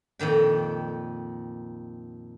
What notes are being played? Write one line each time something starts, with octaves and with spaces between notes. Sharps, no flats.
F2 A#2 D#3 G5